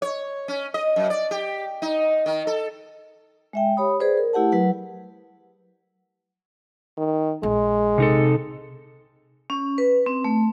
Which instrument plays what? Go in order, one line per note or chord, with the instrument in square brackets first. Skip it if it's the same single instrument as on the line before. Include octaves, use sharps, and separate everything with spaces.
[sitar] C#5
C#4
D#5
F#2
D5
G4
D#4
D#3
A4
[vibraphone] G#3 E5 G5
G4 C#5 B5 D#6
G#4 B4 C5 D5
A#4
A3 E4 G4 F#5 A5
F#3 B4 F#5
[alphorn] D#3
[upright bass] A#1 [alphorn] G#3
[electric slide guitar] C3 D#4 A4
[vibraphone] C#4
B4
C4
A3